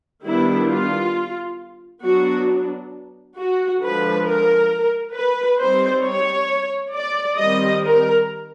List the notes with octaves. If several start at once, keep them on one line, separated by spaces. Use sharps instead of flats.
D#3 G3 B3 D4 E4
F4
F#3 B3 D4 F#4
F#4
D3 F3 G#3 B4
A#4
B4
G3 C4 D#4 C5
C#5
D5
D#3 G3 C4 D#5
A#4